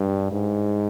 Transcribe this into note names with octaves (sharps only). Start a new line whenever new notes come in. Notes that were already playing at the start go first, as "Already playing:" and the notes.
Already playing: G2
G#2